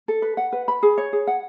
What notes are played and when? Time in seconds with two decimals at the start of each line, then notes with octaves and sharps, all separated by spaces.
0.08 A4
0.22 B4
0.37 F#5
0.52 B4
0.68 B5
0.83 G#4
0.98 C#5
1.13 G#4
1.27 F#5